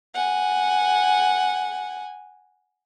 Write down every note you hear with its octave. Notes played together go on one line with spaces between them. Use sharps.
F#5 G#5